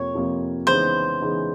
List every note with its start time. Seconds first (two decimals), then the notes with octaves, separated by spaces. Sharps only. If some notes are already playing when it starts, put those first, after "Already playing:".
Already playing: F2 C3 F3 A#3 C#5
0.14 F2 C3 F3 A#3
0.67 C#3 E3 G#3 B3 D#4 C5
1.21 C#3 E3 G#3 B3 D#4